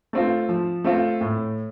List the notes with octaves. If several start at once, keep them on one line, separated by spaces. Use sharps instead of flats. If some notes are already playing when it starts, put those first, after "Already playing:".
A3 C4 F4
F3
A3 C4 F4
A2